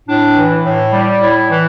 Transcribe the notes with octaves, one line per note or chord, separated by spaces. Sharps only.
A2 D4
E3
A2
G3
A2 E4
E3